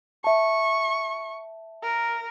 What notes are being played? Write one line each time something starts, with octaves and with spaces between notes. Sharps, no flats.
E5 A5 C#6
A#4